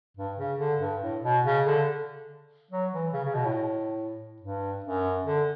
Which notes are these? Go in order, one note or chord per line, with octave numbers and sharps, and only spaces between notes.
G2
C#3
D3
G2
A2
B2
C#3
D3
F#3
E3
C#3
C#3
B2
A2
G2
F#2
D3